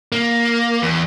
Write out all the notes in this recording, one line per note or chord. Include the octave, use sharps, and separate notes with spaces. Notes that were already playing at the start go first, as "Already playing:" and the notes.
A#3
E2